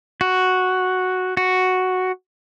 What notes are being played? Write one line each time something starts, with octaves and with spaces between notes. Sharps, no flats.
F#4
F#4